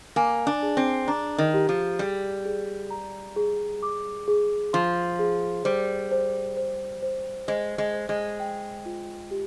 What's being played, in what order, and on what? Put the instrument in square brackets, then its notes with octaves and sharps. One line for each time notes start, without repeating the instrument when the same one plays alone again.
[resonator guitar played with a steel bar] A#3 [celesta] G#5
[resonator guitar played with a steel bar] D4
[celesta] G#4
[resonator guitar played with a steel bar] C4
[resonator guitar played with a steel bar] D4 [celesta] A#5
[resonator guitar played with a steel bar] D#3
[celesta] G4
[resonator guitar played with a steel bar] F3
[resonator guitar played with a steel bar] G3 [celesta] G#4
[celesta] G#4
A#5
G#4
D6
G#4
[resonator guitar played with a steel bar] F3 [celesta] C6
[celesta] G#4
[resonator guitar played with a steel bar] G3 [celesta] C5
[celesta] C5
C5
C5
[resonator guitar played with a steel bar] G#3 [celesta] C5
[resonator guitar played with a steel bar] G#3
[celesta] C5
[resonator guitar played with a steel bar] G#3
[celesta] G5
F4
G4